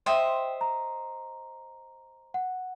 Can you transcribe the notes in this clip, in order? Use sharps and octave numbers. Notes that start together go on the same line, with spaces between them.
C5 D#5 E5 G5 C6
A#5
F#5